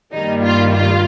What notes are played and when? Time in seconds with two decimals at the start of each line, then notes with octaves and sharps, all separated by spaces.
0.12 G2 D#3 G3 A#3 D#4
0.42 F4
0.73 F4